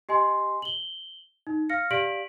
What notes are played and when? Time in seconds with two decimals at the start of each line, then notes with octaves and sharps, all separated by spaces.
0.09 G4 D#5 G#5 C6
0.62 F#7 G7
1.47 D#4
1.69 F5 F6 A#6 C#7
1.91 G4 D5 F5 B6 D7 F#7